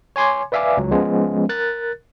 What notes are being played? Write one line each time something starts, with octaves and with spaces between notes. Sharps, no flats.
C#5 G#5 C6 D6 G#6
B4 D5 E5 F5 G#5 D6
C#2 F#3
F3 G#3 B3 C#4
A#4 F#6 A6